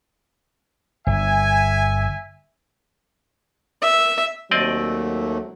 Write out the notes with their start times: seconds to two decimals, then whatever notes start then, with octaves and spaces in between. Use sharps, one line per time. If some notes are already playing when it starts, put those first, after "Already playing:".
1.07 G1 E5 G#5
3.82 E5
4.51 D#2 F#3 A3 C4 D5 D#5